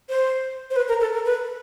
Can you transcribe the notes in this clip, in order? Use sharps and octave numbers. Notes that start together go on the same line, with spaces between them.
C5
C5
B4
A#4
A4
A#4
B4